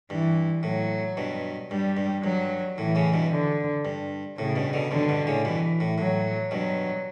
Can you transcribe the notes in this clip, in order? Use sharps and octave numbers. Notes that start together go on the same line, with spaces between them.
G2 E3
A2 F#3
G2 B2
G2 G3
G2
G2 F#3
A2 E3
A2 C#3
G2 B2
D3
G2
A2 C#3
G2 B2
B2 D3
G2 B2 D3
G2 B2
A2 C#3
G2 B2 E3
A2
A2 F#3
G2 B2 F#3